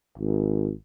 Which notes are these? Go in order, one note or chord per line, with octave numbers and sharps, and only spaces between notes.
G#1